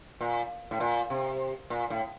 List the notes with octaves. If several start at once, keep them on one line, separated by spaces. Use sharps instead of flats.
A#2
A2
A#2
C3
A#2
A2